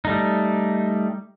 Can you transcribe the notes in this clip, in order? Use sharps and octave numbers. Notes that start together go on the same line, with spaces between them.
G3 A3 D#4